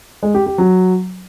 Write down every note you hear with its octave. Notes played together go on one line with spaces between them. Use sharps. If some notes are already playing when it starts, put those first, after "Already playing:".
G#3
G4
G4
F#3